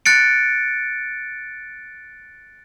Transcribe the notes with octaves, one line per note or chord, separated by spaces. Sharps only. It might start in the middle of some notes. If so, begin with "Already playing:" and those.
F#6 A6 C#7 D7